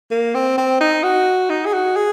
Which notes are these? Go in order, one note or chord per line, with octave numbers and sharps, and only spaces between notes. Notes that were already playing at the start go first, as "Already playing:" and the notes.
A#3
C4
C4
D#4
F#4
D#4
G#4
F#4
G#4